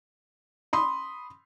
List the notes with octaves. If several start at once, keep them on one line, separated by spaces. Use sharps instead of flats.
B5 C6 D#6